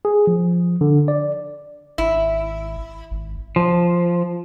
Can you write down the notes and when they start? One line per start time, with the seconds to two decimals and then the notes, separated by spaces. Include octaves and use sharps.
0.05 G#4
0.27 F3
0.81 D3
1.08 D5
1.98 G#1 E4
3.11 G#1
3.56 F3